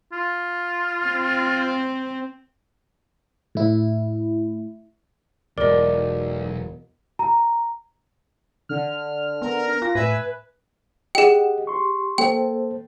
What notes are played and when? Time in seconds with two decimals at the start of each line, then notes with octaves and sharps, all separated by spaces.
0.12 F4
1.07 C4
3.55 A2 E4
5.58 E1 B1 A#4 D5 D#5
7.19 A#5
8.69 D3 F6
9.42 B3 A#4
9.82 F4 A#6
9.95 A2 B4 E5 G#5
11.15 G4 G#4 D#5 F#5 G5
11.67 G4 C6 C#6
12.18 A#3 A4 C5 G5